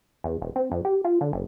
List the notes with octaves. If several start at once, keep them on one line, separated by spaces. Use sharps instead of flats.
E2
E1
C4
F2
G4
F4
D3
F#1